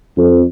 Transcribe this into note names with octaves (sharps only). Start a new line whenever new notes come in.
F2